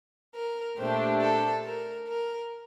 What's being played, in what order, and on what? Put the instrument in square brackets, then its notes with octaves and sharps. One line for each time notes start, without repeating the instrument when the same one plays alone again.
[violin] A#4
[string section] A#2 A3 D4 G4 [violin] C5
[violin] A4
A#4
A#4